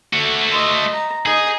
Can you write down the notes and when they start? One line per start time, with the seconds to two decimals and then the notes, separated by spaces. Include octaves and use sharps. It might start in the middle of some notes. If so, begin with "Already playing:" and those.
0.13 A3 F#4
0.51 D#5 C6
0.93 A#5
1.26 D#4 G#4 G#5